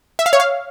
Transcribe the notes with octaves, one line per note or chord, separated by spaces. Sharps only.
E5
F5
C#5
F5